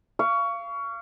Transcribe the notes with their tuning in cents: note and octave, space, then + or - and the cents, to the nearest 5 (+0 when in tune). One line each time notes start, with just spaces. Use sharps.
F5 -25 C#6 +25